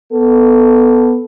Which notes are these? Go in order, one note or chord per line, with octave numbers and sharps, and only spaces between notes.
B3 A4